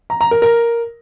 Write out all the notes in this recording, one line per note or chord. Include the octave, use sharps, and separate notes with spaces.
A#5
A#5
A#4
A#4